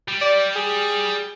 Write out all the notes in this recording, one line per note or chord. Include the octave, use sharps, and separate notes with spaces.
G3
D5
G#4